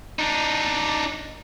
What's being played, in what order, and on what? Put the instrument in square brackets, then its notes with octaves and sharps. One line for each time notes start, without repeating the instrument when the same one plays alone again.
[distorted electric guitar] D4 D#4